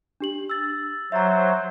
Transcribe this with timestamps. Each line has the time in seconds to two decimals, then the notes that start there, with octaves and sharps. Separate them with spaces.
0.20 D4 G4 F#7
0.50 E6 A6
1.12 F#3 C5 E5 A#5